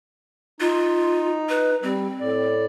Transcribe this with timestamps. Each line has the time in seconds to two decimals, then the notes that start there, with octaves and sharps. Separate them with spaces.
0.60 D#4 F4
1.49 B4
1.83 G3 C4
2.20 A2 D5